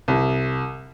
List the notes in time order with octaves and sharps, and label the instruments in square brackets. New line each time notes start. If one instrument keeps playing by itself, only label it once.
[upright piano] C2